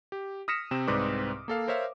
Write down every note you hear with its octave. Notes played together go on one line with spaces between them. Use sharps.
G4
D#6 F6 A#6 B6 C#7 E7
C3 C4 E7
C2 G#2 C4 B4 D5 D6
A#3 A4 F5
A#4 C5 C#5 E5 F5